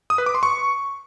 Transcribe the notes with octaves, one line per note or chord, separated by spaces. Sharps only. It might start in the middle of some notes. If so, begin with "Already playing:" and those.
D#6
B4
D6
C6
C#6